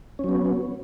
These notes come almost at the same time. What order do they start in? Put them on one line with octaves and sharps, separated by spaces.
C#4 F#3 B3